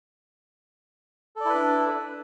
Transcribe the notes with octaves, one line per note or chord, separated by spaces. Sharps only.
D4 E4 A4 B4 D5